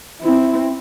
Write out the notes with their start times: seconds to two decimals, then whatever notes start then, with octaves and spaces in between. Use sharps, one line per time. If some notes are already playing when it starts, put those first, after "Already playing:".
0.21 C4 E4